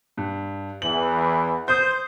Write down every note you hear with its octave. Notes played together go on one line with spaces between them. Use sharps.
G2
E2 E3 F#7
C5 D#6 G6